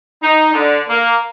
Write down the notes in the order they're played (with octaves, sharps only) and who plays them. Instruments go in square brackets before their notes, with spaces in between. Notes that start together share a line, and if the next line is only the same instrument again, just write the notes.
[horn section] D#4
D3
A#3